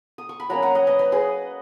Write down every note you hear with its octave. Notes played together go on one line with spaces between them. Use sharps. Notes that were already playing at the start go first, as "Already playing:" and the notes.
D#6
C#6
B5
F#3 A#3 C#4 F#5 A#5
F#5 A#5
D#5 F#5
B4 D#5
B4 D#5
G#4 B4